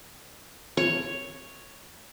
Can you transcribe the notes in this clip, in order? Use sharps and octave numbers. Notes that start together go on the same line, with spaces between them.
C#5